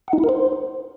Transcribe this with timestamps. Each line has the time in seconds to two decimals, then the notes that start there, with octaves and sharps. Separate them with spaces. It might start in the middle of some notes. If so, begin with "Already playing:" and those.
0.08 F#5
0.13 D#4
0.18 E4
0.24 A#4
0.29 C5